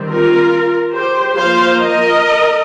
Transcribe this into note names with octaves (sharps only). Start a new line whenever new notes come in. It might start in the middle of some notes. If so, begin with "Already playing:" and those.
Already playing: D#3 G3 C4
F4 A#4
G4 C5
F3 A#3 C5 F5
A#4 D#5